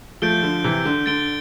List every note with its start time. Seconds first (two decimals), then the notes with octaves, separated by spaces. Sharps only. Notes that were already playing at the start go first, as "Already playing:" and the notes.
0.22 F3 A3 G6 D7 G7
0.43 D3 F3
0.64 C3 E3
0.85 D3
1.06 D3 A6 D7 G7